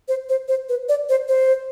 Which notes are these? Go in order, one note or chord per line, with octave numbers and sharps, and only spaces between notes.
C5
C5
C5
B4
D5
C5
C5